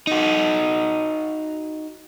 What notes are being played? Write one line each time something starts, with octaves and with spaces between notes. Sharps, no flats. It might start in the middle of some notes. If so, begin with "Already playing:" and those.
D#4 F#4